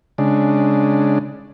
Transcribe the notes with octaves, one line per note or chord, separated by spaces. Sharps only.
C#3 G#3 D4